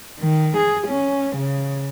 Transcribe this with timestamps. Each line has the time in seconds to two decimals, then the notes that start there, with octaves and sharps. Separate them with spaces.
0.20 D#3
0.56 G#4
0.88 C#4
1.36 C#3